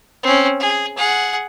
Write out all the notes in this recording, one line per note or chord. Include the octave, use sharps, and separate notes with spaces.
C4 C#4
G#4
G#4 F#5